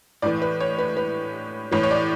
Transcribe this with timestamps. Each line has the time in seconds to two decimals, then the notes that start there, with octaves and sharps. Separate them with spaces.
0.22 A2 E3 D5
0.42 B4
0.61 C#5
0.79 B4
0.97 B4
1.72 A2 E3 C#5
1.83 C#5
1.91 D5